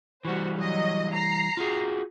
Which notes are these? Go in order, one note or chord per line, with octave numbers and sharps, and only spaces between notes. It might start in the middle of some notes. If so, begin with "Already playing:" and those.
E3 G3 F#4 C5
F#3 D#5
A#5 C7
F4 F#4 G#4